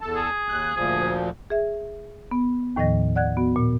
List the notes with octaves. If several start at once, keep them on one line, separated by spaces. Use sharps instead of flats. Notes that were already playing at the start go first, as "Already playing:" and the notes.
E2 A4 A5
G#4
D#2 F#6
D2 A#2 F3 G#4
G#4 E5
B3
D#2 A2 D#3 F3 D#5 A#6
D5 F#5 F#6 G#6
B3 F#4
A#2